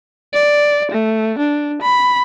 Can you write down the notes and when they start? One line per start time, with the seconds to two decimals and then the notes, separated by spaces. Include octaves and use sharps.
0.34 D5
0.91 A3
1.39 D4
1.82 B5